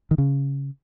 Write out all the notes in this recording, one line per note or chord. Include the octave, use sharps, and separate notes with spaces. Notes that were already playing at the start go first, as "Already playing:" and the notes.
D#3
C#3